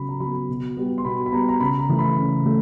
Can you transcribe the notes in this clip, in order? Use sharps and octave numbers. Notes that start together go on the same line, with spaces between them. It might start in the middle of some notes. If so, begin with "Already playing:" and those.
Already playing: C#3 F#3 B3 B5
A#5
F#3 B3 B5
B2
G3 B3
C6
B2 B5
B5
G3 B3 A#5
A#5
C#3 B5
A#5
E3 A3
B5
C#3
A3